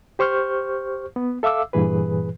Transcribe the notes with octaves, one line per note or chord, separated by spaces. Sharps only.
G4 C5 C#6 F6 G6
B3
A4 E5 F5 D6 E6
G2 A#2 E3 G#4 B4